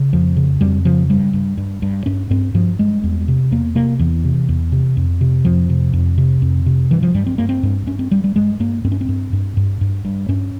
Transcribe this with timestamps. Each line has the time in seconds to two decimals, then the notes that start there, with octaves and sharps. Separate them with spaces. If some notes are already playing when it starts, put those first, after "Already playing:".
Already playing: C#3
0.13 F2 F3
0.37 C#3
0.61 F2 G3
0.85 C#3 F3
1.10 G2 G3
1.33 G2
1.58 G2
1.82 G2
2.06 G2 C#4
2.30 G2 C4
2.54 G2 F3
2.79 G2 G#3
3.03 E2
3.28 C3
3.51 E2 A#3
3.75 C3 A#3
3.99 E2 E3
4.25 C3
4.49 E2
4.72 C3
4.97 F2
5.21 C3
5.45 F2 F3
5.69 C3
5.93 F2
6.18 C3
6.42 F2
6.66 C3
6.91 G2 E3
7.03 F3
7.14 G2 G3
7.27 C4
7.38 G2 A#3
7.49 C4
7.63 G2
7.87 G2 C#4
7.99 C4
8.11 G2 G3
8.24 G3
8.36 G2 G#3
8.60 G2 A#3
8.84 G2 C4
8.92 C#4
9.01 C4
9.09 G2
9.33 G2
9.57 G2
9.81 G2
10.05 G2
10.29 G2 C#4